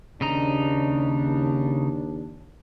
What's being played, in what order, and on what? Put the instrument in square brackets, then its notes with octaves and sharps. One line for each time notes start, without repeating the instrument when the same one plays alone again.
[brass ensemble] D#2 D4 [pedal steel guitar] C#3 D#4 A#5